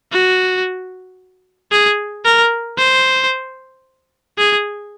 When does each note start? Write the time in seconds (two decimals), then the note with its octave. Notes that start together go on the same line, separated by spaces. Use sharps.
0.12 F#4
1.72 G#4
2.25 A#4
2.78 C5
4.38 G#4